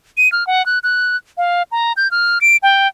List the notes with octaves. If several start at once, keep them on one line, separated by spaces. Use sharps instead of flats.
D#7
F6
F#5
F#6
F#6
F5
A#5
G6
F6
D7
G5